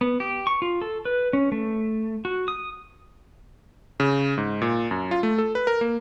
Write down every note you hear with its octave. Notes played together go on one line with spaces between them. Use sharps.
B3
G4
C#6
F4
A4
B4
C#4
A3
F#4
D#6
C#3
G#2
A#2
F#2
F4
A3
A4
B4
A#4
A#3